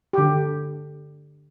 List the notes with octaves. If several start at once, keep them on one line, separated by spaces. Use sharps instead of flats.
D3 G4